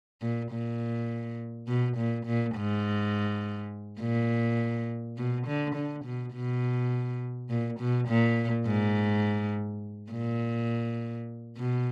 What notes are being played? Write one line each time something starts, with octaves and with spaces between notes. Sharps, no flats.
A#2
A#2
B2
A#2
A#2
G#2
A#2
B2
D3
D3
B2
B2
A#2
B2
A#2
G#2
A#2
B2